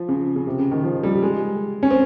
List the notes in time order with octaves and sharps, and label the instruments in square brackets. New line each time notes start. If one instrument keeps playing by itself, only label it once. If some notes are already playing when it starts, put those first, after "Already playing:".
Already playing: [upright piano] F3
C#3
C#3
C3
C#3
D#3
F3
G3
G#3
C#4
C4